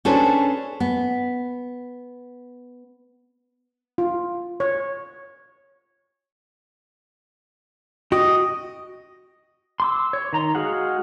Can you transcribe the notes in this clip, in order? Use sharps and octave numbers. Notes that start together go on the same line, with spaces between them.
C#4 D4 G#4 A4 B4 C5
B3
F4
C#5
F#4 D#5 G5
C6 D6 E6
C#5
D#3 A#5 C6
G#3 F#4 G#4 F5 F#5